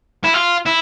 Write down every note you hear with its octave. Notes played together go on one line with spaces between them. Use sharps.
E4
F4
E4